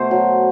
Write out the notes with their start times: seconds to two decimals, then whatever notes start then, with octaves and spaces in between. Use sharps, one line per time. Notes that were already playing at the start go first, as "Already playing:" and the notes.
Already playing: B2 A3 C5
0.11 F#3